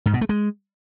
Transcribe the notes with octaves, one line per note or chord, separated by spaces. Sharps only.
G#2
B2
A3
G#3